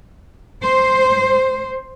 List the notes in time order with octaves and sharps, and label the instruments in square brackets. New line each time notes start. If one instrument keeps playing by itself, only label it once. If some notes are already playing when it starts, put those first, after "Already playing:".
[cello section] C5